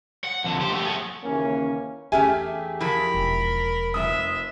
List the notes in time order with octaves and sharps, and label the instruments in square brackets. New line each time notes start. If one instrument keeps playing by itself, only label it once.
[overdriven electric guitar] F#5
F2 D3
G4 C5
A3 G4
G#4 F#5
[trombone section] D#2 C#3 E3 A#3 C#4
[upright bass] E2 [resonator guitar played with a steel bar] A3 C#4 G#5 [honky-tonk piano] G4 G#4 E5
[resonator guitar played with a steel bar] F3 E4 [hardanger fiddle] A#4 B5
[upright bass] E1
[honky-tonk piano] F1 D#6 [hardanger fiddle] E5